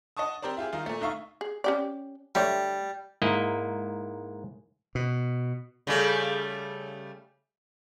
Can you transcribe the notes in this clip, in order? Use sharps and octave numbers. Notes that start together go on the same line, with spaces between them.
D#5 F#5 A5 C#6 D#6
C4 G4 A#4 C5 D5
E4 F4 G4 G#4
D#3 D#4 F4
A#2 A3
D2 D#4 E5 F5 C#6
G#4
C#4 G4 D5
D3 G3 A3 C#5
G#2 A#3 E4 D#5
B2
C#3 G3 A3